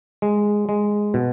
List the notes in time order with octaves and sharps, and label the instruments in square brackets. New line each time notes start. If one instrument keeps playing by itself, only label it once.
[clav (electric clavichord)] G#3
G#3
B2